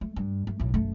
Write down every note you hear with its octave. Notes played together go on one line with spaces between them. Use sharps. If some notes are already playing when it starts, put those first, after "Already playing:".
A3
G2
A3
B1 A2
F#1 A3